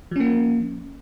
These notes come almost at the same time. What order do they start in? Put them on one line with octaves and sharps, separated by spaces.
F3 C#4 A#3